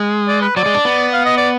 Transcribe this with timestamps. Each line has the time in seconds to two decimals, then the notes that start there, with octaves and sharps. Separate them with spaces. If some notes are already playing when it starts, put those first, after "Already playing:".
Already playing: G#3
0.28 D5
0.42 B4
0.56 F#3 D5
0.66 G#3
0.75 D4
0.85 B3
1.13 F5
1.25 D#5
1.37 D5